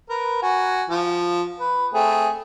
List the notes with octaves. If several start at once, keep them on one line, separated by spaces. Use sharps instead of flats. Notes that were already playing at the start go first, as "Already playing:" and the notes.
A#4 B4
F#4 G#5
F3
B4
A3 C4 G#4